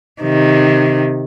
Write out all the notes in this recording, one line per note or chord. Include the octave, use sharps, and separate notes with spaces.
C3 D#3